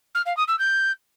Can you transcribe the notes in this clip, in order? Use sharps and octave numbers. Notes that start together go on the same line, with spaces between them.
F6
F5
D#6
E6
G6